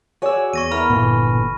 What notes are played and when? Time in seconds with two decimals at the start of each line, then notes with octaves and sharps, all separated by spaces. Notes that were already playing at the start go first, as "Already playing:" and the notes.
0.22 F#4 G#4 C#5 D5 E6
0.54 E2 C#6 A#6 D#7
0.71 B3 E4 A#4 B5 F6
0.90 G1 A#2 E3 A4